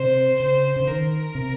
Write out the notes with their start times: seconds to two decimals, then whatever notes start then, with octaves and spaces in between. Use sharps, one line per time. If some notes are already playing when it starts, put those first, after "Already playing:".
Already playing: C3 C5
0.40 C#3 C5
0.76 C#3
0.87 D#3 A#4
1.35 C3